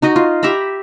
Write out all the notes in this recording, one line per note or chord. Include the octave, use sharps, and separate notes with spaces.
D#4 F#4 D#5
F4
G4 E5 A#5 B5